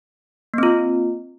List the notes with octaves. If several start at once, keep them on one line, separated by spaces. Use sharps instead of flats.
A#3 C4 F4